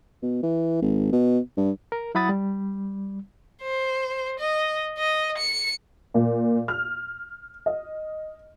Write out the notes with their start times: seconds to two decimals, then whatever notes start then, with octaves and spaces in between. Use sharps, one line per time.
0.22 B2
0.43 E3
0.82 G#1
1.12 B2
1.57 G2
1.92 A#4
2.15 F#3 E4 F#5 B5 D#6 A6
2.29 G3
3.62 C5
4.39 D#5
4.98 D#5
5.37 C#7
6.14 A#2
6.68 F6
7.66 D#5